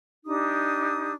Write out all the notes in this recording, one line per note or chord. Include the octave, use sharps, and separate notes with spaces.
D4 D#4 G4 D#6